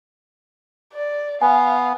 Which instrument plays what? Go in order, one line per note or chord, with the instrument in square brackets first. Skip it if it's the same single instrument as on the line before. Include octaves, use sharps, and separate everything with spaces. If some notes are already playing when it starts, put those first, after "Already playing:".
[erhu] D5
[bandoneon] B3 [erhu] F5 [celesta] G#5